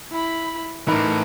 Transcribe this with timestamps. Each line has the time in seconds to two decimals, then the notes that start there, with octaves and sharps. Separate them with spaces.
0.12 E4 B5
0.88 A2 E3 D#4 A#4 B5